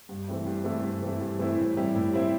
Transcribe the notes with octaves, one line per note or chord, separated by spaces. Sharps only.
G2
E3 A3 C4 E4
G2
E3 A3 C4 E4
G2
E3 A3 C4 E4
G2
E3 A3 C4 E4
A2
G3 C4 E4
A2
G3 C4 E4